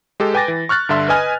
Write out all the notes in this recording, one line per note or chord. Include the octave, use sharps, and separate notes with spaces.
G#3 G4 A4
B4 G5 G#5 D6 A6 A#6
E3
C#6 F6 F#6 A6
G2 D3 E5 C6
B4 D#5 G#5 F6